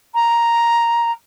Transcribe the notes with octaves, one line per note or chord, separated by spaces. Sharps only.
A#5